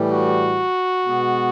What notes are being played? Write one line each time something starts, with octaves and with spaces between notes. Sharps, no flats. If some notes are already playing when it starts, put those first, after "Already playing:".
Already playing: A2 E3 G3
F#4
B2 G#3 B3